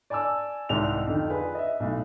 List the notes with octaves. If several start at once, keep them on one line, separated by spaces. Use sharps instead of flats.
D5 G#5 A5 D6 E6
C2 G#2 D#3 D5 F7
F2 D3 D#3
F4 G#4 B4 D5
D#5 E5
B1 A2